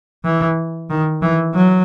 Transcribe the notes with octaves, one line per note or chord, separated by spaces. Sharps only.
E3
D#3
E3
F#3